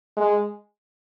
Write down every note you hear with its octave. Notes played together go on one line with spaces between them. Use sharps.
G#3